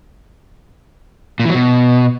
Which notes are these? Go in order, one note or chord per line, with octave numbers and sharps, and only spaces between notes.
A#2
E3
F#3
B2